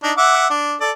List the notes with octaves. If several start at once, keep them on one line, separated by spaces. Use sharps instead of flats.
D4 D#4
E5 F#5 D6
D4
A4 D5